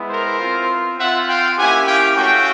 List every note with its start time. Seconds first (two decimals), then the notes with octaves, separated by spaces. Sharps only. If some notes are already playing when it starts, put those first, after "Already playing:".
Already playing: G#3 B3 E4
0.10 A#4 C5
0.40 C4 F4
0.98 C4 F4 E5 F#5
1.28 F5 G5
1.57 A#3 C#4 E4 G4 F#5 G#5
1.87 F5 G5
2.16 A3 C#4 F#4 F5 G5